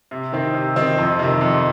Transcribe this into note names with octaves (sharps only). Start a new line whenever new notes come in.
C3
D#3 C4 D#4
C3
D#3 C4 D#4
F2
C3 D#3
F2